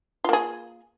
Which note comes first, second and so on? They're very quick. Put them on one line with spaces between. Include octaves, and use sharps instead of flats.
F4 A#3 G#4